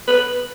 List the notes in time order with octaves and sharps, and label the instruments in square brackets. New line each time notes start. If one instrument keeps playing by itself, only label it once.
[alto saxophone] B4